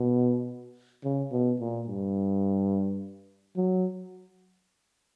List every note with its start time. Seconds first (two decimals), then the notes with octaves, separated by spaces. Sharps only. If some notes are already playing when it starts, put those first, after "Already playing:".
Already playing: B2
1.04 C#3
1.31 B2
1.60 A#2
1.87 G2
3.56 F#3